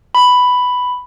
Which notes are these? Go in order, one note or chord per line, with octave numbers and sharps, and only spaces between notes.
B5